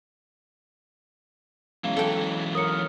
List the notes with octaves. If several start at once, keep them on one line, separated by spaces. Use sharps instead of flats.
E3 F#3 G#3 B3 C#4 F5
A4 G5
A#4 C#5 D#6 C#7